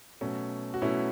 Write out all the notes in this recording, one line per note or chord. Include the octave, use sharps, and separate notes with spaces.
B2 F#3 A3 C#4
F#4
B2 F#3 A3 C#4 E4